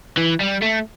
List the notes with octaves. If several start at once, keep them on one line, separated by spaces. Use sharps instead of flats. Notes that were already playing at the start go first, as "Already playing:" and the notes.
E3
G3
A3